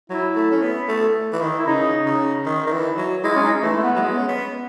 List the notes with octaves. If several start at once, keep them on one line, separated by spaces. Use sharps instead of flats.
F#3 E4
A3
C#4
B3
A3
E3
D#3
E4
C#3 D#4
C#3
D#3
D#3
E3
F#3
G#3 E4
C#4
D#4
E3 A3
A3
B3
F#3
G#3
C#4
B3